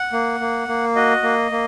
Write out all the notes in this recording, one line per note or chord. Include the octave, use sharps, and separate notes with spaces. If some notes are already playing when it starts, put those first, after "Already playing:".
Already playing: F#5
A#3
A#3
A#3
F#4 D#5
A#3
A#3